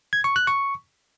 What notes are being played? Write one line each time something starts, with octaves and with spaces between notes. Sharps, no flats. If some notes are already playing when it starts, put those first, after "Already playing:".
G#6
C#6
F#6
C#6